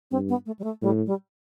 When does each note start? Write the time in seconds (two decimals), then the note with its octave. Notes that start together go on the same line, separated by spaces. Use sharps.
0.11 G2 C4
0.29 B3
0.46 A3
0.59 G3
0.64 A3
0.82 A2 G3
1.06 G3